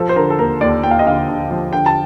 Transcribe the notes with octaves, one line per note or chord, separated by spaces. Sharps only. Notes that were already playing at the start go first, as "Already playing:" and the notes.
Already playing: F3 A4
C5
D3 A#4
A4
D#2 A#4
D#2 D5
D#2 G5
F5
D#5
D3 F5
D3
F3
D3 G5
A5